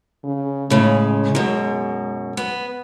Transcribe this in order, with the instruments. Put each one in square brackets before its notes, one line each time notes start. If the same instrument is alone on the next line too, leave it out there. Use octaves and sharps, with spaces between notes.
[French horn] C#3
[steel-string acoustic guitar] A2 C#3 [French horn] G#3
[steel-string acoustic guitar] F#2 B2
B3